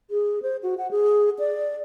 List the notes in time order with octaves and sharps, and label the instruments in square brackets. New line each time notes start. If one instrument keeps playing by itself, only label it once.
[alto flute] G#4
C5
F#4
F#5
G#4
D5